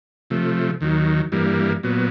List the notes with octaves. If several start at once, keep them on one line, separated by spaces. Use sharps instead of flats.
C3 F3 A3
D#2 D#3 F#3
G2 E3 G3 A#3
A#2 F#3 B3